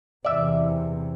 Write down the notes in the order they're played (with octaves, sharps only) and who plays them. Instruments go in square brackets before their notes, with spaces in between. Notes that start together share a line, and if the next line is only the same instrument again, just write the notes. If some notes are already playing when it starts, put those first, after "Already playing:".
[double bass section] E2 C3 E3 [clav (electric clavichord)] D5 E5